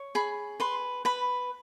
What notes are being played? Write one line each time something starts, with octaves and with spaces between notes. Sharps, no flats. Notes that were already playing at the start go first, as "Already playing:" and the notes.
Already playing: C#5
G#4 B5
B4 C6
B4 B5